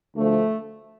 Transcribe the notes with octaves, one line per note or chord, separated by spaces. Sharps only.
D2 D3 F3 A3